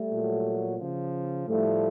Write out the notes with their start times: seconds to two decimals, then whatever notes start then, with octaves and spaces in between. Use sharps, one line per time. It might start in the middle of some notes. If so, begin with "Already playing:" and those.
Already playing: G3 A3
0.09 A#2 F#3
0.78 C#3 F3
1.47 A2 F3 G3 A3